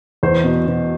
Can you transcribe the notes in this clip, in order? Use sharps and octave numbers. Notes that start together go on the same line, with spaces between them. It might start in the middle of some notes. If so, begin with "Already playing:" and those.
E2 C5
B2
B2